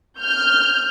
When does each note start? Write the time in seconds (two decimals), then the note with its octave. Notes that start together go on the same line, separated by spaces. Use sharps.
0.21 F6 G6